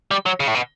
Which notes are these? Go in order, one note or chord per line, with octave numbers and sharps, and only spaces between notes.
G3
F#3
C#3
A2
B2